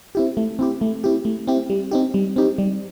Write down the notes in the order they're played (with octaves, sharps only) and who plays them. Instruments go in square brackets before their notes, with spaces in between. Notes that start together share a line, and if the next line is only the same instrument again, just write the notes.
[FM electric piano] C4 E4 G4
A3
C4 E4 G4
A3
C4 E4 G4
A3
C4 E4 G4
G3
C4 D#4 G4
G3
C4 D#4 G4
G3